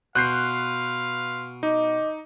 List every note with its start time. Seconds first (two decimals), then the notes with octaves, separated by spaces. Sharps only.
0.16 B2 B4 F5 C6 F#6 G6 C7
1.63 D#4 D#5 D6